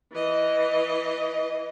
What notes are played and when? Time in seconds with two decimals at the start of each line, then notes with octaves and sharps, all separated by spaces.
0.12 E3 D#5